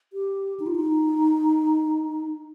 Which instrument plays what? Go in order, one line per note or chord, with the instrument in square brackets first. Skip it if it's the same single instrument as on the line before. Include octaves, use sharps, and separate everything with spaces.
[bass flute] G4
D#4
F4
D#4